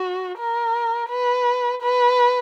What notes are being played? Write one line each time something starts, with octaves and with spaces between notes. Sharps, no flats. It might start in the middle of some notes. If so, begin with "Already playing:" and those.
Already playing: F#4
A#4
B4
B4